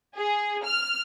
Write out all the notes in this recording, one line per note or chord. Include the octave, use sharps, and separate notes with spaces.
G#4
F6